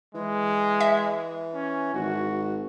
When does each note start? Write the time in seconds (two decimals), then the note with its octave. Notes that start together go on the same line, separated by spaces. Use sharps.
0.14 E3 G#3
0.80 E5
1.54 C#4
1.94 G#1 F#4